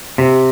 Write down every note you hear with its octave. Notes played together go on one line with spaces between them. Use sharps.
C3